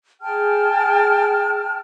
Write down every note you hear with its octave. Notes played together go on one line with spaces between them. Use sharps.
G#4 G5 A5 F6